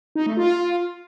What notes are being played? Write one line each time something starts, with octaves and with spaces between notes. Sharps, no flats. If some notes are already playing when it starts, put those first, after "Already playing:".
D#4
A3
F4